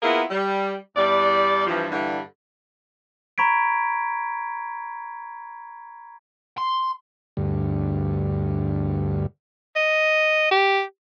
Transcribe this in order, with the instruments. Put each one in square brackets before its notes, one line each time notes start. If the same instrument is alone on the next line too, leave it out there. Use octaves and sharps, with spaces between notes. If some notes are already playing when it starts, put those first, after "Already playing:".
[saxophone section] A#3 B3 E4 F4 G#4 A#4
G3
E2 G3 D5
G2 E3 F3
G2 D3 E3 G3
[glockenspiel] A#5 B5 C#6 G#6 B6 D7
[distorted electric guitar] C6
[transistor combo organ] D2 G2
[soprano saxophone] D#5
G4